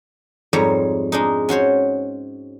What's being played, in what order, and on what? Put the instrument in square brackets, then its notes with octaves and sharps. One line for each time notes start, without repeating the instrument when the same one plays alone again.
[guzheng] F2 G#2 G3 C#5 A#5
G#3 D4 D#4
C#4 F#4 C5 C#5